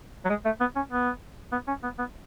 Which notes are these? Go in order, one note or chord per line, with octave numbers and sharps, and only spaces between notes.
F#3
G#3
A3
B3
C#4
B3
B3
C#4
B3
B3